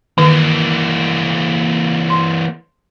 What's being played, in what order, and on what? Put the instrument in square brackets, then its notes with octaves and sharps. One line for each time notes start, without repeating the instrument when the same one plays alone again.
[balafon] D#3 [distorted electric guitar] E3 A#3
[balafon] C6